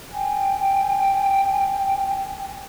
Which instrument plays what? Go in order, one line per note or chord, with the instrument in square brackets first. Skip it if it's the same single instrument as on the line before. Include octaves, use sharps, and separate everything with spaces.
[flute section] G5 G#5